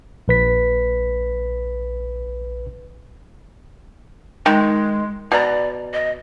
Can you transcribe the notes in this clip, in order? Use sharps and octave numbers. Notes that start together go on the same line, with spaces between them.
A#1 B4 B6
D#3 G#3
B2 D5 A#5
D#5